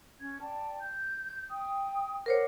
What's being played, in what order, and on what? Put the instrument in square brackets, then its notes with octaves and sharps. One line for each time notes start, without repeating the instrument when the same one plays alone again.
[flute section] C#4 G#6
D5 G5 A5
G6
G5 D#6
[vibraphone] A#4 C5 C#5 [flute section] F#5 D6 F6